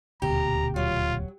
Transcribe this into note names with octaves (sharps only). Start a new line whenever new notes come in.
D#1 D2 B2 G4 A#5
F#3 F4